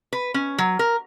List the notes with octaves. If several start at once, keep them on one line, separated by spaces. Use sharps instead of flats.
B4
C#4
F#3
A#4